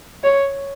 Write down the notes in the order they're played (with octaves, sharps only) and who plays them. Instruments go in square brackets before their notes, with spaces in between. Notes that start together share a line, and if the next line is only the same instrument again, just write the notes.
[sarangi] C#5